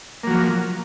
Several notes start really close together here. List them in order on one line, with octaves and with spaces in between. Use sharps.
A#3 F#3 F3